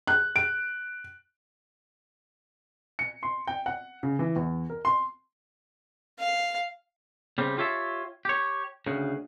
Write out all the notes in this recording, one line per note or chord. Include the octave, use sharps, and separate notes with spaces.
F#6
D7
C#7
C6
G5
F#5
C#3
E3
E2
A#4
C6
F5
C#3 G3 C4
F4 G4 C#5 E5 A5
G4 C#5
D2 C#3